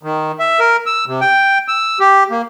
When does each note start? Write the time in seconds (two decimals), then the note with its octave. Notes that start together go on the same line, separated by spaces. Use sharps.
0.03 D#3
0.39 E5
0.60 A#4
0.86 E6
1.07 C3
1.21 G5
1.68 E6
2.00 G4
2.31 A#3